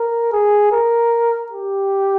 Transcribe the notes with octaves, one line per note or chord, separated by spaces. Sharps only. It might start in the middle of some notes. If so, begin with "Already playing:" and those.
Already playing: A#4
G#4
A#4
G4